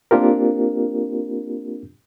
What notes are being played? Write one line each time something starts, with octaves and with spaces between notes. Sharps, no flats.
A#3 C4 D4 F4 G4 A#4